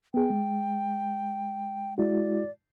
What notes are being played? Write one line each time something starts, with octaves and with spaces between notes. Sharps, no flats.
B3 G#4 G5
G#3
G#3 E4 F#4 D5